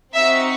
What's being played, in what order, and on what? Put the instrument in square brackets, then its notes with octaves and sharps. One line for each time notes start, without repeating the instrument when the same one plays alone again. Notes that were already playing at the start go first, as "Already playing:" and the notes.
[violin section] C4 D#4 F#4 E5